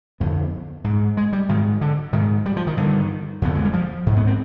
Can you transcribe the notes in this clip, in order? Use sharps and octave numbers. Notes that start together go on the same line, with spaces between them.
F2 D3 B3
G#2
G#3
G3
G#2 D#3
D3
G#2 D#3
G3
F3
D#3
G2 D3 D#3
F2 D3 B3
G#3
G3
F3
G#2
B3
C4